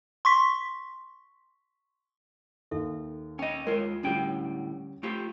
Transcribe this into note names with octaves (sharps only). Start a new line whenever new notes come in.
C6 C#6 B6
D#2 A4 E5
C#4 D#5 G5
G#3 F4 A#4 C#5
D2 A2 G3 C#4 G5
A3 F4 G4